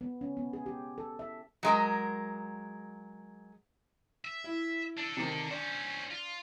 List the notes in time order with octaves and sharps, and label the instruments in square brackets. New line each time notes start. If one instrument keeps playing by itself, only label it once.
[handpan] B3
C#4
B3
G#4
G4
A4
E5
[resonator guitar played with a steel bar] F#3 G#3 A#4
[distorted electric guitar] E5
[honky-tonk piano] E4
[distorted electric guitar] D4 A4
[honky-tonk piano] C3 D#3
[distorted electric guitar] C#4 C5 [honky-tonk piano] D4
[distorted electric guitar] F4